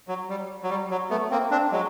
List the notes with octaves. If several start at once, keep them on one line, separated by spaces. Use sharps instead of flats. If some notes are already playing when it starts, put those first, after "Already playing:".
F#3
G3
F#3
G3
F#3
A3 B3
A#3 C4
C4 D4
F#3 G#3